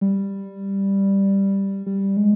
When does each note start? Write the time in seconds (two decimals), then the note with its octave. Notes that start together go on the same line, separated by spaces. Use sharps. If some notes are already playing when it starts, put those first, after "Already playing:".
0.01 G3
1.86 G3
2.17 G#3